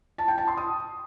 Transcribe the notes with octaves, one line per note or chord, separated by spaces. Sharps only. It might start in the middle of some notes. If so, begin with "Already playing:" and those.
A5
G5
A5
C6
D#6